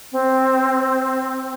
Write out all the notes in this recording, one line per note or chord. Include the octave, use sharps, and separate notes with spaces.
C4